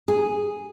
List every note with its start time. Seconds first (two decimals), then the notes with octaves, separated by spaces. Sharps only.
0.08 G#4